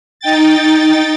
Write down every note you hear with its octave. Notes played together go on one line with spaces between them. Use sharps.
D#4 G5 A6